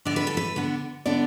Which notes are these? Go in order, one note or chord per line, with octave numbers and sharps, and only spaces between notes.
D3 B3 D4 D5
B4
A4
B4
D3 B3 D4
D3 B3 D4 D5